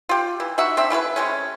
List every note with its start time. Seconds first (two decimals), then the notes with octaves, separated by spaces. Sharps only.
0.09 F4 G4
0.40 E3
0.58 D#4 F#4 E5 F#5
0.77 C4 D4 E5
0.90 C#3 E4 F4 B4
1.16 C3 G#3 A3 C#4